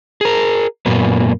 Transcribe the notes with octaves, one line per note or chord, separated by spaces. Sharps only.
G#4 A#4
F#2 A#2 A#3 B3